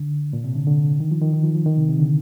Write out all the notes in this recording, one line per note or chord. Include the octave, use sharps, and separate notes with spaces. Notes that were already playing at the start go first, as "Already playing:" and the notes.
Already playing: D3
A#2
C3
D3
D3
D#3
F3
D#3
D#3
F3
F3
D#3
C3
C3
D3